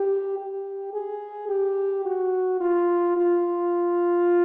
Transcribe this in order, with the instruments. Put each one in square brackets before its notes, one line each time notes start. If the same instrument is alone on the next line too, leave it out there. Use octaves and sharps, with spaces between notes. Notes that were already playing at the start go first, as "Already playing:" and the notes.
Already playing: [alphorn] G4
G4
G#4
G4
F#4
F4
F4